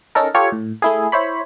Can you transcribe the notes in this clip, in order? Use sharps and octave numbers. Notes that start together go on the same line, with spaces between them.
C#4 D#4 A4 A#4
F4 G4 A4 C#5
A2
A3 E4 G#4
E4 C5 C#5 B5